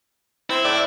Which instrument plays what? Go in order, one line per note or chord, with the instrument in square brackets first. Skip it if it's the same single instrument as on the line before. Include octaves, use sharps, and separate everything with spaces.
[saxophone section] C4 [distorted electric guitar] E4
[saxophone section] A2 [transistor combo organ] D5